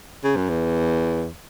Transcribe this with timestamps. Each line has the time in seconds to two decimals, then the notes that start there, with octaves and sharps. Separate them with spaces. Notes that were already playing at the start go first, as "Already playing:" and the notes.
0.24 C#3
0.36 F#2
0.49 E2